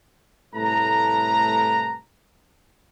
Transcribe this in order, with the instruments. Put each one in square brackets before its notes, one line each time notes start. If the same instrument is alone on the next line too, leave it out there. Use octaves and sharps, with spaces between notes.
[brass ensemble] C2 A2 A3 B4 A5 A#5